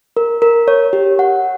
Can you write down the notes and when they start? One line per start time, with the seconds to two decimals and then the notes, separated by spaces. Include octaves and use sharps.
0.17 A#4
0.42 A#4
0.68 C#5
0.93 G4
1.19 F#5